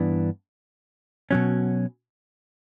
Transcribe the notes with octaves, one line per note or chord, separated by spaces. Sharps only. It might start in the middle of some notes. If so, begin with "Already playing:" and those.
Already playing: G2 E3 B3 D4
B2 F#3 C#4